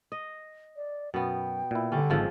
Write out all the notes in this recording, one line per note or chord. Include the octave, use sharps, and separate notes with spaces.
D#5
D5
F#2 B2 B3 G5
A#2 E4
D3 G3 C#4
G#1 G#2 F3 G#3 A4